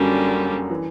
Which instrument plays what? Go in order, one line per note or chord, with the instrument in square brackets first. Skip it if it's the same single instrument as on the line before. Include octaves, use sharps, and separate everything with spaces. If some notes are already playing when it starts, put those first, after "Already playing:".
Already playing: [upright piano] F#2 F#3 [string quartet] D3 G3 A#3 C#4
[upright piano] E3